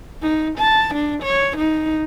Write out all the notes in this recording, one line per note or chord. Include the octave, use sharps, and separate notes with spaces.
D#4
A5
D4
C#5
D#4